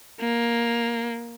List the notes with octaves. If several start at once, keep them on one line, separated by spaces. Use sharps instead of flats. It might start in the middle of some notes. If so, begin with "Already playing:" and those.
A#3